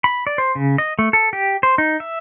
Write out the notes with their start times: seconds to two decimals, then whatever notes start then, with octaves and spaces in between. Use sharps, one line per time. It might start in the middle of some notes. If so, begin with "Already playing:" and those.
0.04 B5
0.27 D5
0.38 C5
0.55 C#3
0.78 D#5
0.99 A3
1.13 A4
1.33 G4
1.63 C5
1.78 D#4
2.00 E5